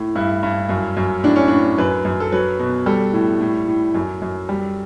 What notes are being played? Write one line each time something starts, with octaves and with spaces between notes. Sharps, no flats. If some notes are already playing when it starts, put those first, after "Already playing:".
Already playing: A2
G2 E4
G2
F#2
F#2
A2 D4
C#4
A2 D4
F#2 B4
F#2
A4
F#3 B4
B2
G3 A4
A2
A2
A2
F#2
F#2
G3